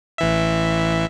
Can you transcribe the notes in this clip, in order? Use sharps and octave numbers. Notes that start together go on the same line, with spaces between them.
A1 E3 E5